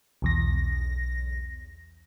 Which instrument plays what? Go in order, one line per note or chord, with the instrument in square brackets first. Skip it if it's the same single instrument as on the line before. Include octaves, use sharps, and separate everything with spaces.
[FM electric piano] B1 E2 A#6